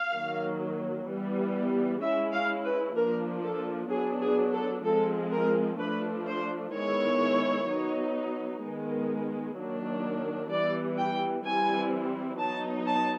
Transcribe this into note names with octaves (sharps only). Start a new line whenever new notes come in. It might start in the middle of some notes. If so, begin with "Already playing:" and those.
Already playing: F5
D#3 F#3 A#3
E3 G3 B3
G#3 C#4 E4 E5
F5
B4
F3 A#3 D4 A#4
A4
F#3 B3 D4 G#4
G#4
A4
F3 G#3 C4 A4
A#4
F3 A3 D4 B4
C5
D#3 G#3 B3 E4 C#5
F#3 B3 D#4
D#3 G#3 B3
D#3 F#3 A#3 D4
E3 G3 B3 D5
G5
E3 G3 C4 E4 G#5
F#3 B3 D#4 A5
A5